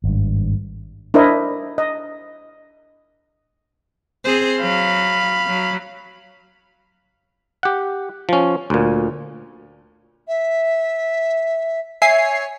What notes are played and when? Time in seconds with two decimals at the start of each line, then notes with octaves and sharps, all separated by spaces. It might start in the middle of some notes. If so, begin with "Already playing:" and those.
0.04 G#1 G2
1.14 D4 E4 A#4 C5 D#5
1.78 D#5
4.24 C4 G#4 C5
4.60 F#3 F5 B5
5.47 F#3
7.63 G4 F#5
8.29 F3 C#4
8.70 D2 A#2
10.28 E5
12.02 C#5 E5 G#5 C7